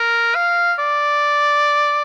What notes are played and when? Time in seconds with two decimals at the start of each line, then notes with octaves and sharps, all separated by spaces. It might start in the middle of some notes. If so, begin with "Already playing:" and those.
Already playing: A#4
0.35 F5
0.79 D5